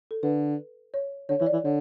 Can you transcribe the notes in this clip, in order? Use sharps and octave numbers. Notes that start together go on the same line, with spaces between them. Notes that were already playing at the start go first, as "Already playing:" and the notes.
A4
D3 B4
C#5
D3 C#5
E3 C#5
D5
E3
D3 C#5